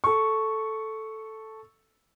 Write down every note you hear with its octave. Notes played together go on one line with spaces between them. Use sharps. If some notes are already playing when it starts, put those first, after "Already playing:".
A4 C#6